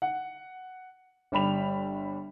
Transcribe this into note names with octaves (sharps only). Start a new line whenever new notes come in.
F#5
G1 G3 B5 F7